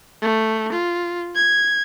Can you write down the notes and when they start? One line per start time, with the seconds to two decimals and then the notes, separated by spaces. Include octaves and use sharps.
0.22 A3
0.73 F4
1.35 G#6